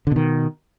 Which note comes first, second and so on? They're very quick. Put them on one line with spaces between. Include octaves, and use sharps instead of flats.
D3 B2 D#3